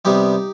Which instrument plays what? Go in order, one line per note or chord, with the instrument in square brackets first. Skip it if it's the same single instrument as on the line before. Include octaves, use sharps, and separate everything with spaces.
[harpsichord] C3 G3 B3 D#4 G4